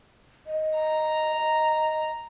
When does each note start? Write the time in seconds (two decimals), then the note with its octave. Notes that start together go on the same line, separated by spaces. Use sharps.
0.46 D#5
0.77 A#5
1.39 D#5